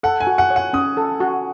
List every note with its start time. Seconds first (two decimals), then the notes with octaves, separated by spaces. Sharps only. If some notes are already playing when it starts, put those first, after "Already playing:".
0.03 A4 F#5
0.20 G#5
0.27 F#4
0.38 F#5
0.50 C#5
0.56 F#5
0.73 C#4 D#6
0.97 A4
1.20 F#4